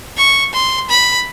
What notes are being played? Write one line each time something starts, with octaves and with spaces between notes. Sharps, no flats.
C#6
C6
B5